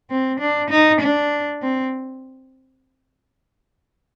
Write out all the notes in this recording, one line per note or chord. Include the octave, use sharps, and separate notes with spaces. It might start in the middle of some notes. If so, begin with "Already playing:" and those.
C4
D4
D#4
D4
C4